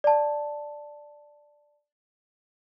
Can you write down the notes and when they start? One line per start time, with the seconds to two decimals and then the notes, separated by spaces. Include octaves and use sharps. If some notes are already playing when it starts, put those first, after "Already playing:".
0.04 D5 A5